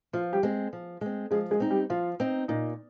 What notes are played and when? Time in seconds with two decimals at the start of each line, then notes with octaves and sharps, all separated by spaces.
0.13 F3 F4
0.33 G3 G4
0.43 G#3 C4
0.73 F3
1.01 G#3 C4
1.31 F3 G#3 G#4
1.51 G#3 G#4
1.60 C4 D#4
1.70 G3 G4
1.90 F3 F4
2.20 C4 D#4
2.48 A#2 D#4